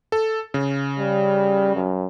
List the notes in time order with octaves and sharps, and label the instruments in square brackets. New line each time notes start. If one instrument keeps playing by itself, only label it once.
[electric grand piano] A4
C#3
[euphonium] G3
F#2